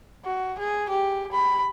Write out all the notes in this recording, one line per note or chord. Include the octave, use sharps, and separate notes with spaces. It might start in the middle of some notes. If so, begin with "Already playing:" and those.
F#4
G#4
G4
B5